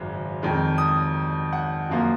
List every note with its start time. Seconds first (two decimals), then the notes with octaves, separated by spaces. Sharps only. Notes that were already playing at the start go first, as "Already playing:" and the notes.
Already playing: G#1 F#2 C#3
0.42 F2 D#3 G#3
0.78 D#6
1.53 F#5
1.89 F#2 F3 A#3